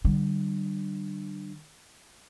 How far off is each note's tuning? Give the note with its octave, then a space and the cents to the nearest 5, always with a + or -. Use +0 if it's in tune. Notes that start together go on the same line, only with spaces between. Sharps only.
D3 +25 G3 -25